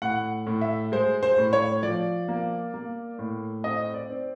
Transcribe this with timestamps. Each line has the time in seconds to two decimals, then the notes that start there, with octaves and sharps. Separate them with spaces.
0.02 A2 F#5
0.47 A2
0.61 E5
0.92 G#3 C5
1.23 C5
1.38 A2
1.53 C#5
1.83 F3 D5
2.28 A#3
2.74 A#3
3.19 A2
3.64 C4 D#5
3.94 D5
4.10 C4